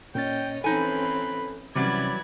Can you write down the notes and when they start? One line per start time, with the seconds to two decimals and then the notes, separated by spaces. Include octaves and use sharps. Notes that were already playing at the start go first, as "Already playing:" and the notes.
0.15 A#2 C#4 C#5 D#5 G5 A6
0.64 E3 C4 C#4 D#4 A4 B4 G#5
1.75 C3 E3 F#3 G3 C#4 D5 B5 G#6